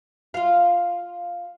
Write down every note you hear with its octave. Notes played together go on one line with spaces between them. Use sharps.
F4 F5